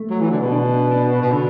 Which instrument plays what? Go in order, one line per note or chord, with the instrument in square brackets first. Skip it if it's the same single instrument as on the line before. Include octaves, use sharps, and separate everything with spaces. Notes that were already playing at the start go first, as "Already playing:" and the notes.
Already playing: [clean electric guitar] A3
[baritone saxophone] F#3
E3
D3
B2
[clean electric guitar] D4
D4
[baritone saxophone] B2
D3